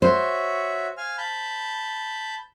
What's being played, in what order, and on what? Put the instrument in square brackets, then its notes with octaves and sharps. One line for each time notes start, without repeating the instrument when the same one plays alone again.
[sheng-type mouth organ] F#4 C#5 E5 [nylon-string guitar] C5
[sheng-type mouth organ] F5 G#5 F6
A5 B5 G6